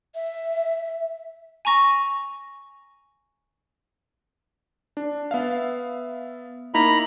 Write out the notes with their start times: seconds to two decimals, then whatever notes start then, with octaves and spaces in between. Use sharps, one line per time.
0.15 E5
1.65 G#5 A#5 C#6 A#6
4.97 D4
5.31 B3 E5 F5
6.74 A#3 D#4 E4 A#5 B5